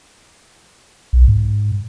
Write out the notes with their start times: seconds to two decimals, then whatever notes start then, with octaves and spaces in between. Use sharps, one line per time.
1.13 B1
1.28 G#2